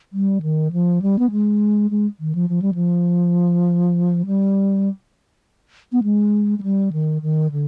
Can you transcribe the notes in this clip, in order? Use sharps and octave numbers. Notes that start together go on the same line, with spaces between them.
G3
D#3
F3
G3
B3
G#3
G#3
D#3
F3
F3
G3
F3
G3
B3
G#3
G#3
G3
D#3
D#3
D3